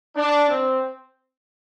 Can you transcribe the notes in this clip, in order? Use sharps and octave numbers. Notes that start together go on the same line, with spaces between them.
D4
C4